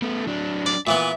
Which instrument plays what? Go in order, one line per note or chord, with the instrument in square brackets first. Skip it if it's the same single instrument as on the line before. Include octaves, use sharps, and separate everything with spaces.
[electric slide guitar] A3 B3
F#3 D4
[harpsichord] D5
[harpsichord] A#2 E3 B3 [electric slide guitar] E5